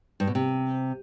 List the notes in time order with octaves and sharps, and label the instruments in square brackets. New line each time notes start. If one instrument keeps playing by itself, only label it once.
[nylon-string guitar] G2
B2
C3